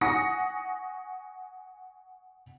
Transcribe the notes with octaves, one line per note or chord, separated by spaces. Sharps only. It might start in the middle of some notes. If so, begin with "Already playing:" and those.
F#5 G#5 C#6 D#6 A#6 C#7